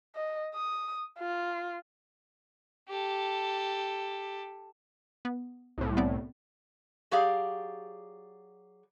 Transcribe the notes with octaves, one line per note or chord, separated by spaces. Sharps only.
D#5
D#6
F4
G4 A4
B3
C2 A2
B3 C4 D5
F#3 G4 G#4 D5 F5